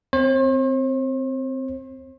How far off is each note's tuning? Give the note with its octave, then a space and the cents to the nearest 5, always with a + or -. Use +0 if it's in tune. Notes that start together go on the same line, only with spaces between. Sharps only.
C4 -10 C5 +45